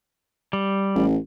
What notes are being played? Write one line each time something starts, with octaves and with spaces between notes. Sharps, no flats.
G3
A1